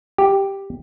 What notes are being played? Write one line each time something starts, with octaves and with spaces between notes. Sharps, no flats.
G4